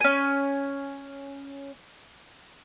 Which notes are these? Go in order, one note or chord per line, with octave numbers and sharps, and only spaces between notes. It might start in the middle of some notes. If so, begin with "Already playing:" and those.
C#4 G#5